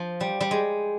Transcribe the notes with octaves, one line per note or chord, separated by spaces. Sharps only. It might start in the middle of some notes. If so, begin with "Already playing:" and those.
Already playing: F3
G3
G3
G#3